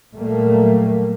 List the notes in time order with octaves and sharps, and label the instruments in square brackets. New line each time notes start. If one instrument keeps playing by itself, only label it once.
[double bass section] A#2 F#3 G3 A3 A#3